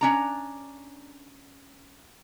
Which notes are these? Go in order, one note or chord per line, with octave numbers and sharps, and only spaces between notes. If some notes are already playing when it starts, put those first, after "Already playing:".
C#4 D4 A#5